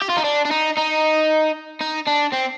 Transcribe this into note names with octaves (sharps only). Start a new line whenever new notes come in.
G4
F4
D#4
D4
D4
D#4
D#4
D#4
D4
C4